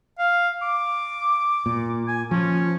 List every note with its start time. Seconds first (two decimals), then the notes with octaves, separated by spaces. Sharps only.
0.19 F5
0.62 D6
1.66 A#2
2.08 G#5
2.31 F3 C#4